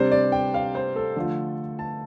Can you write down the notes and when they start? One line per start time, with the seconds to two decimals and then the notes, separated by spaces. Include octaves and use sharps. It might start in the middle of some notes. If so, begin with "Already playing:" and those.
Already playing: C3 G3 D4 C5
0.12 D5
0.32 G5
0.54 F5
0.75 C5
0.96 A4
1.16 D3 F3 A3 F4
1.79 A5